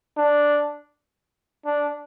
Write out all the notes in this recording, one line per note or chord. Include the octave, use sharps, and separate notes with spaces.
D4
D4